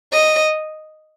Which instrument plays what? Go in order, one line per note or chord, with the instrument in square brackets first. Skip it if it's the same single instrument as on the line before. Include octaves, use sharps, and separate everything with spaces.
[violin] D#5